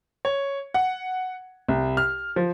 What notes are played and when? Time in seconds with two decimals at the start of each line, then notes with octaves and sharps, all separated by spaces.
0.25 C#5
0.74 F#5
1.68 C2
1.97 F6
2.36 F3